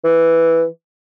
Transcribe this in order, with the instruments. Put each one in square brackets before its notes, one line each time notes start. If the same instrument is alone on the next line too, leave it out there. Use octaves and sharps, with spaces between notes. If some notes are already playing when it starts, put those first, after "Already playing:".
[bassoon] E3